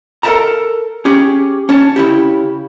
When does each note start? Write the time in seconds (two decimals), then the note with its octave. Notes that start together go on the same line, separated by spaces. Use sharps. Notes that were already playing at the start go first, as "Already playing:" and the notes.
0.23 A4 A#4 C5 E5 A5 A#5
1.05 C#4 G4 G#4
1.69 C#4 C#5 A5
1.96 C#3 E4 G4